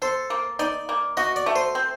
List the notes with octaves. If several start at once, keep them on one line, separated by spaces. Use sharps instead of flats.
A4 C5
A#3
D#4 D5
A#3
F#4 D#5
D5
A3
C5
C4